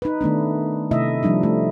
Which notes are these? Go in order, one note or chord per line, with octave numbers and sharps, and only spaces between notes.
D#4 B4
D#3 A3 B3 D4
C3 A3 E4 D#5 E5
F3 G3 D4 D#4
A3